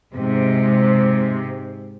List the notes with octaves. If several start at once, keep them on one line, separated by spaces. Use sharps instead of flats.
G#2 C3